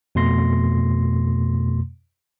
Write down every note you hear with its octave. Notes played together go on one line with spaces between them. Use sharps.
F2 B2 A3 C6 A#6